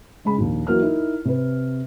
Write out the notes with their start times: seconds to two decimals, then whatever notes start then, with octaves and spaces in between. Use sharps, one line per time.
0.24 C#3 G#3 G#4 B5
0.38 A#1 D#2
0.67 E3 F#3 A#3 F#4 A#4 F6
0.82 D#4 E4 A#4
1.25 C3 B4